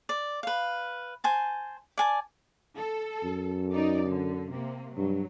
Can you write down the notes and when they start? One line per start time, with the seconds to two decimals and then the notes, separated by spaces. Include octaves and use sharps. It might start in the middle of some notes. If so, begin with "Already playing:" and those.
0.09 D5
0.43 B4 F5
1.24 C5 G#5 A5
1.98 D5 G#5 A5
2.76 A4
3.23 F#2
3.73 D#4 D5
4.08 D3
4.52 C3 A#3
4.97 G2 F#3